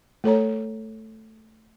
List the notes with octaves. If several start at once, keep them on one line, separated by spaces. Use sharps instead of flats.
A3 A4 C#5 A#5